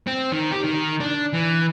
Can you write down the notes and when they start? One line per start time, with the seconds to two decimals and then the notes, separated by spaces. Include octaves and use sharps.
0.07 C4
0.32 D#3
0.52 G4
0.64 D#3
1.00 D4
1.33 E3